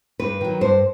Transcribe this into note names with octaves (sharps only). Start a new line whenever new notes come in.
G2 B4
D#3 F#3
G2 C5